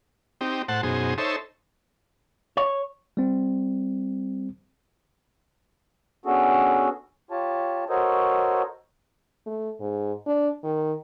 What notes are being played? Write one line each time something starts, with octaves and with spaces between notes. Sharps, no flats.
C4 D#4 G4
A2 C5 F#5 A5
F#2 B2 D#4 G#4 C5
D#4 A4 C5 C#5 E5
C#5
G3 C4
B3 C#4 D4 F#4 G#4 A4
F4 G4 C#5 A5
F#4 A4 A#4 C5 C#5 D#5
A3
G#2
D4
D#3